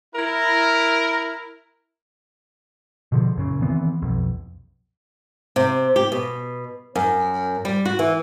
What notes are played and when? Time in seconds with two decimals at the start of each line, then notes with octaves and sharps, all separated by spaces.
0.14 E4 A#4
3.12 B2 D3 F3
3.35 A#1 F#2 C#3
3.62 D#3 E3 B3 C4
4.02 B1 F2
5.56 C3
5.96 G4
6.12 B2
6.95 F#2
7.65 G3
7.85 F#4
7.99 E3